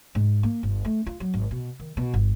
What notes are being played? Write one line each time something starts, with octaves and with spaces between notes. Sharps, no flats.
G#2
A#3
G1
A3
F4
F#3
G#1
B2
D#3
B2
G1